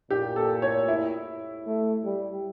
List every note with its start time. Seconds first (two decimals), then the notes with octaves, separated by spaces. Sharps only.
0.10 A#2 G4
0.36 A4
0.62 C#5
0.88 E4
1.67 A3
2.04 G3